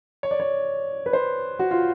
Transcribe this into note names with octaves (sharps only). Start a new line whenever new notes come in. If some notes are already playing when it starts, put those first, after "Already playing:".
C#5
D5
C#5
B4
C5
F#4
F4